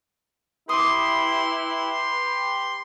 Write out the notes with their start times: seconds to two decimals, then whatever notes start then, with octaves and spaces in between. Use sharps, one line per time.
0.69 E4 G4 B4 C6 D6 D#6